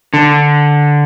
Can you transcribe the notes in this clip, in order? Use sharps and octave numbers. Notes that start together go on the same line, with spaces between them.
D3